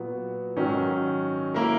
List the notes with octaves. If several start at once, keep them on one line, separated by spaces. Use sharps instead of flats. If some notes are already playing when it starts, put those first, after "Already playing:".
Already playing: A#2 F#3 B3 F#4
G#2 D#3 F#3 C#4
A#3 E4 A#4